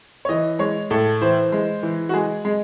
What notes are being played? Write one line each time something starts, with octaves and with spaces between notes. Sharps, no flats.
C#5
E3 D#5
G#3 C#5
A2 A4
E3 C5
G#3
E3
F#4
G#3 G#4
G#3